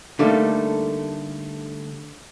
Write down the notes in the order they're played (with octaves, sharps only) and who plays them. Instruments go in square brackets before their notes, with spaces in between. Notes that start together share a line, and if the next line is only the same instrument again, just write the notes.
[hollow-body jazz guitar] D3 G3 A3 A#3 D#4